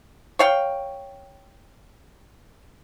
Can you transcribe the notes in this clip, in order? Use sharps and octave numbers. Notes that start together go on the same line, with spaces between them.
C#5 F5 G5